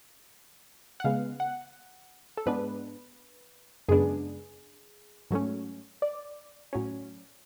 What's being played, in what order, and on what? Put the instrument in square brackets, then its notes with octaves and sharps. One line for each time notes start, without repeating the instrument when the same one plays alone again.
[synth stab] F#5
C#3 G#3 B3 F5
F#5
A4
G#2 G#3 B3 D4 B4
F#2 C#3 G#3 B3 D4 G#4
G#2 F#3 A3 C#4
D5
A2 F#3 C#4